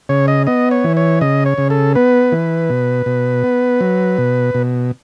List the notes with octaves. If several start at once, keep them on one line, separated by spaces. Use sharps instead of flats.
C#3 C#5
D#5
B3 D#5
C#5
E3
C#5
C#3 D#5
C#5
C#3
A4
B3 B4
E3
B2
B2
B3
F#3
B2
B2